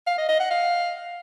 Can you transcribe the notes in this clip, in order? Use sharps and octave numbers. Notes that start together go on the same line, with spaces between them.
F5
D#5
D#5
F#5
F5